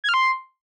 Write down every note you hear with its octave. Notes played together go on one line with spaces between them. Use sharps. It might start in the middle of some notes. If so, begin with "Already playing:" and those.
G#6
F6
C6